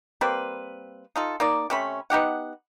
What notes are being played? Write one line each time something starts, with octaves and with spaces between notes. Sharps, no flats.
G3 A#3 C4 B4
D#4 F4 A4
A#3 D#4 D5
C3 A3 C#4 B5
B3 D#4 G4 F#5